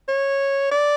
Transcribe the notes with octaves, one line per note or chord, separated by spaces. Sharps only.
C#5
D5